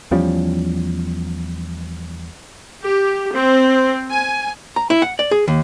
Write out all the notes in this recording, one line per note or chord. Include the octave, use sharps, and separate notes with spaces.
E2 F3 G3 C#4
G4
C4
G#5
A#5
E4
F#5
D5
G#4
D#2